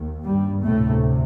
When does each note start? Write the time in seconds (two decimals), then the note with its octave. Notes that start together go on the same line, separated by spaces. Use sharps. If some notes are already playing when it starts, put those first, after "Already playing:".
Already playing: D#2
0.25 G2 G3
0.63 D2 A2 C3 A3